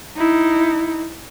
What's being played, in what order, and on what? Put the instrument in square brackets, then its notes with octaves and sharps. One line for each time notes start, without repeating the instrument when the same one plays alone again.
[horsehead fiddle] D#4 E4